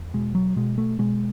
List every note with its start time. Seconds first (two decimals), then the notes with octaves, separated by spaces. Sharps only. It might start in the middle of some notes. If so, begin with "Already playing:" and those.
Already playing: E2
0.14 B2 G#3
0.35 F#3
0.56 B2 G#3
0.78 A3
0.99 B2 G#3